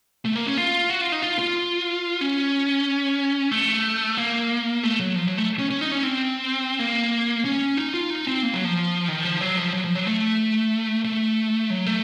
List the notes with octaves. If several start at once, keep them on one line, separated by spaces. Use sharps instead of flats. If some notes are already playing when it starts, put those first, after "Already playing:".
A3
A#3
C#4
F4
F#4
F4
D#4
F4
F4
C#4
A3
A#3
A3
F#3
F3
F#3
A3
C#4
C#4
D#4
C#4
C4
A#3
C#4
D#4
F4
D#4
C4
A#3
F#3
F3
D#3
F3
F#3
F3
F#3
F3
F#3
A3
A3
F#3
A3